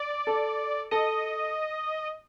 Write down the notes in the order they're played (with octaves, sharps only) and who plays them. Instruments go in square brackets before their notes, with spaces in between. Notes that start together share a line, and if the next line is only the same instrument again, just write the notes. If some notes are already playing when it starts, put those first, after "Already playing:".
Already playing: [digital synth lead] D5
[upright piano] A4
[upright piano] A4 [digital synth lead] D#5